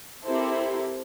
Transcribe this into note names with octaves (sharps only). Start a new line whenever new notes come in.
C4 E4 G4 A4 A#4 C5